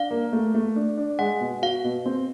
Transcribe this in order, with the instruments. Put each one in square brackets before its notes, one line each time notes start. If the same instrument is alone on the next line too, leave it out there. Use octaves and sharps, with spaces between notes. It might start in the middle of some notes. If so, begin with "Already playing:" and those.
Already playing: [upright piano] D4 [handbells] F5
[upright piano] A#3
A3
A3
D4
D4
[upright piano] G#3 [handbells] F#5
[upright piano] B2
[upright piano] F#4 [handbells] F5
[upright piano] B2
C4